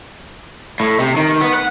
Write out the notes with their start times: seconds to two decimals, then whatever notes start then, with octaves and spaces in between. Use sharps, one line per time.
0.80 A2
1.00 C3
1.17 D#3
1.41 B3
1.54 F#5